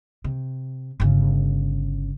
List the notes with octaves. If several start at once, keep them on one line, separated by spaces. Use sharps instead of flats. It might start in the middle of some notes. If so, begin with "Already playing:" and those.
C3
G1 C#3